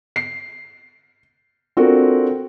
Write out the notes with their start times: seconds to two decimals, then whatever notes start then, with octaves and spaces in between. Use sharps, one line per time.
0.16 C7
1.77 C4 D4 F4 F#4 A4 A#4